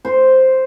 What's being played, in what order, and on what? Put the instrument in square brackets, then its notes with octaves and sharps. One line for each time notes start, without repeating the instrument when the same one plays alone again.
[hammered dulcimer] C5